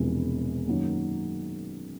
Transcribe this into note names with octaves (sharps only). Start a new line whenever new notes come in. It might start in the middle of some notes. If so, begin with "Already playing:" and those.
Already playing: E1 E2 C3 F3
F#2 D#3 F#3 A#3